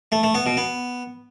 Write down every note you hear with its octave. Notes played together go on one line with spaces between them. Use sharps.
A3
A3
B3
B2
B3